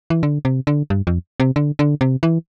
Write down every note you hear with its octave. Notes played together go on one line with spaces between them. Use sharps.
E3
D3
C3
D3
G2
F2
C3
D3
D3
C3
E3